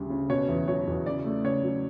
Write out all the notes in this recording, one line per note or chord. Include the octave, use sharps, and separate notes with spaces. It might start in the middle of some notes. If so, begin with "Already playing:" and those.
Already playing: D2 C#3 G3
C#3
B2 C#5
E2
F#3 C#5
E2
C#3 D5
A3
C#3 C#5
F#3